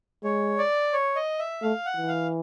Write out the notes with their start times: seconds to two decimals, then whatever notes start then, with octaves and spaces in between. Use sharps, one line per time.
0.24 G#3 C#5
0.58 D5
0.93 C#5
1.16 D#5
1.39 E5
1.62 A3 F5
1.86 F#5
1.97 E3
2.08 F5